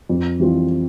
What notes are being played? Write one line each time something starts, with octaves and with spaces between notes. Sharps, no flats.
F2
E3 G3 C4 F4